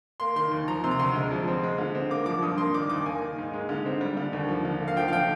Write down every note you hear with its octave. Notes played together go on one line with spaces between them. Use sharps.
A#3 C6
D#3 C6
D#2
F3 A#5
C3 C6
A#5
D2 C6
G#3
F3
C4
G#3
D3
C4
A#3 D6
F3 D6
G2 D#6
A#3 C6
D#3 D6
D#2 D6
A#3 G#5
D#3
G#2
G#3
D3
C4
G3
D3
D#2
F3
D3
A#3
F5
F3 G5
F5
D3 G5